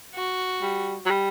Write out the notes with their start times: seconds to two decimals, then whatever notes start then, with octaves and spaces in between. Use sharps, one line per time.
0.15 F#4
0.62 G3
1.06 F#3
1.10 G3